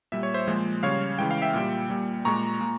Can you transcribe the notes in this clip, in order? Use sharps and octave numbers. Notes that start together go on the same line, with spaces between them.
A#2 G3 E5
C#5
C5 E5
A#2 F3 G#3
C#3 G3 C#5 F5
C#3 E3 G#3 G5
F5
E5 G5
A#2 G3
A#2 G3
A#2 G#3 A#5 C#6
A#2